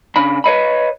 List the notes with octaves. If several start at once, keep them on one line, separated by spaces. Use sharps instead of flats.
C#3 D4 B5
B4 C#5 D#5 B5